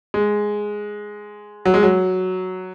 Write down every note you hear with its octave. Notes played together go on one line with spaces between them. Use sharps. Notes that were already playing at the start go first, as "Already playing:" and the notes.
G#3
F#3
G#3
F#3